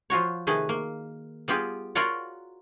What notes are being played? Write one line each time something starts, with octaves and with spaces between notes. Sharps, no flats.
F3 F4 F#4 C#5
C3 D#3 A3 G#4 B4
A#3
G3 B3 F4 G4 G#4
F4 F#4 A#4 C#5 D5 F#5